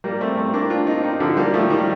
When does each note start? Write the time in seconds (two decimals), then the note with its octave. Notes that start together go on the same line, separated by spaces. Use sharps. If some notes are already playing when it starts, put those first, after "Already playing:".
0.04 G3 A#3
0.21 A3 C4
0.37 A3 C4
0.54 A#3 D4
0.70 D4 F4
0.87 C4 D#4
1.04 C4 D#4
1.20 D3 F3
1.37 G3 A#3
1.54 F3 A3
1.70 D#3 G3